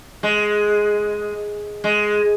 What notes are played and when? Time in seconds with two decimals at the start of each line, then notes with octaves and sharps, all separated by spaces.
0.23 G#3
1.84 G#3